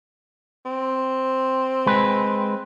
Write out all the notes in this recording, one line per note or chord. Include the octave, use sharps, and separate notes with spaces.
C4
G#3 B4